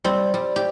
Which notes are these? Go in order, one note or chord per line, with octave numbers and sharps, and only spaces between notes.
G3 C4
G3
G4